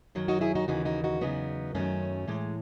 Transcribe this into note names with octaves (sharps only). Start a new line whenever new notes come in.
F#2 D#3 F#3
D#4 F#4
E4 G#4
D#4 F#4
D#2 C#3 E3 D#4 F#4
D#4 F#4
D#4 F#4
E2 C#3 F#3 B3 D#4
F#2 D#3 F#3 A3 C#4
A2 E3 G#3